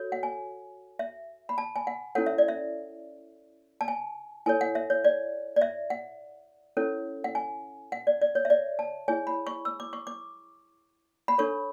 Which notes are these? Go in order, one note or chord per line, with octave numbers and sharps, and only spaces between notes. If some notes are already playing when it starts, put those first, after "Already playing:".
Already playing: F#4 A4 C#5
F#5
G#5
E5
B5
A5
G#5
F#5
C#4 E4 A4 C#5 F#5
E5
D5
E5
A5
G#5
E4 A4 C#5 G#5
F#5
E5
C#5
D5
D5
E5
F#5
C#4 E4 A4 C#5
F#5
G#5
F#5
D5
D5
C#5
E5
D5
A5
E4 G#4 C#5 G#5
B5
C#6
E6
D6
C#6
D6
B5
D4 A4 C#5 C#6